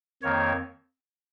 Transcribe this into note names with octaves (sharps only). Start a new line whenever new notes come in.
F2 D#3 A#3 C#5